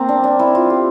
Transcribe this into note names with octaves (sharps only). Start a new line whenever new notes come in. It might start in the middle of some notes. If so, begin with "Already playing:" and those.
Already playing: A#3 C4
D4
D4
E4
F4
G4